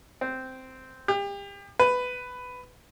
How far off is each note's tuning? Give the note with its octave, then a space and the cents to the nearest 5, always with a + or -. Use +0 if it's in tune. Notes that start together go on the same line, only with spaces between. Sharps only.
C4 -10
G4 +35
B4 +10